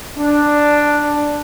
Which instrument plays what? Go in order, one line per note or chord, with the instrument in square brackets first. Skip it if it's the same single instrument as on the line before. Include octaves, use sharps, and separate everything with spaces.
[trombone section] D4